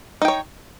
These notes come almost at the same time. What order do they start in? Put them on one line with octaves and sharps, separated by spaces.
D#4 G5 C#5